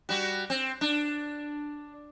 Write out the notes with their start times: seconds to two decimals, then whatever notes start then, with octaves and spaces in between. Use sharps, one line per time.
0.09 G3 F#4
0.50 C4
0.81 D4